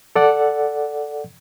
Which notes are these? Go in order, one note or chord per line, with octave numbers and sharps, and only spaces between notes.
A4 D5 F#5